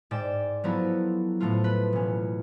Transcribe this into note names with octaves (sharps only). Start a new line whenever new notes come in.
G#2 D5 G5 E7
F3 F#3 B3 E4 A4
A2 F3 A3 B3 F4
B4
E1 C#4